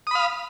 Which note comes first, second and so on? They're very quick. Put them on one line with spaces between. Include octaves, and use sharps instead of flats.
D#6 B5 F5